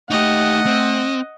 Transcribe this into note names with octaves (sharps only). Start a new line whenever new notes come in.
A3 D#4 G4 D#5 F#5
C4